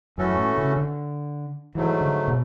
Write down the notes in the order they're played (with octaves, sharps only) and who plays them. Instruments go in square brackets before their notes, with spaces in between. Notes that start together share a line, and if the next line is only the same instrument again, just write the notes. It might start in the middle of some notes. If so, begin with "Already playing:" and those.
[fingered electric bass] F#2 [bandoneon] E3 A3 C#4 F#4 A4
[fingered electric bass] A2
C#3
D3
[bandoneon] G#2 F#3 A3 [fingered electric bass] E3
[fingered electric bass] D3
B2